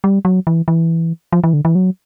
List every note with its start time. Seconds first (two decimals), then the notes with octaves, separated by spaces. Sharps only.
0.04 G3
0.25 F#3
0.47 E3
0.68 E3
1.32 F3
1.44 E3
1.53 D3
1.65 E3
1.75 F#3